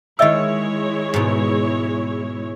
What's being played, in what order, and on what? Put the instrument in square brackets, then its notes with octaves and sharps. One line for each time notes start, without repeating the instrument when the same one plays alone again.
[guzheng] D#3 G5 [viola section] G#3 E4 C#5 [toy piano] D#5 E5 E6
[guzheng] G#2 B2